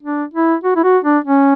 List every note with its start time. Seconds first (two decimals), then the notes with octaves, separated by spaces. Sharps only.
0.03 D4
0.34 E4
0.63 F#4
0.76 E4
0.84 F#4
1.04 D4
1.24 C#4